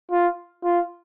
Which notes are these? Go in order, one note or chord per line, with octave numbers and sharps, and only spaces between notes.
F4
F4